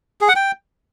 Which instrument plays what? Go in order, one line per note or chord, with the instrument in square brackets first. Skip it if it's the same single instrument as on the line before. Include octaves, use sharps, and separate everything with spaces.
[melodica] G#4
F#5
G5